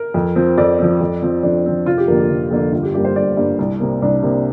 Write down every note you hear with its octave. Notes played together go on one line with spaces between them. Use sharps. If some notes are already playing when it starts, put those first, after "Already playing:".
Already playing: A#4
F2
F3 C4
F2 D5
F3 C4
F2
F3 C4
F2 D4
F3 C4
F1 F4
G4
F2 D3 A#3 A#4
G4
F1
F2 D3 A#3
G1 F4
G4
G2 G3 A#3 G4
C5
G1 D5
G2 G3 A#3
C2
C3 A#3
C2 D4
C3 A#3